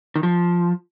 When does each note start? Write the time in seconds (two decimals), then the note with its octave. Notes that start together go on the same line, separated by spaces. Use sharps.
0.16 D#3
0.23 F3